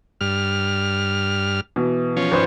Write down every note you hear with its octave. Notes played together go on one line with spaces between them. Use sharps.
G2 F6
B2 E3
F3 C#4
G#1 B4 C5